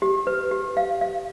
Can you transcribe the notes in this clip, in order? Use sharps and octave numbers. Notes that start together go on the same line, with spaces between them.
G4
B4
G4
F5
F5